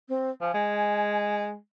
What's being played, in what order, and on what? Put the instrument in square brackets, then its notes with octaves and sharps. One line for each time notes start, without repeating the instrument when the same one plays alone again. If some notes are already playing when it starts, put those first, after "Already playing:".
[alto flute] C4
[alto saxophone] F3 [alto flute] G#5
[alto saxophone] G#3